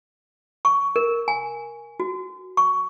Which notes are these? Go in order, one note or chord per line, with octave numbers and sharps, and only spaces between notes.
C#6
A#4
G#5
F#4
C#6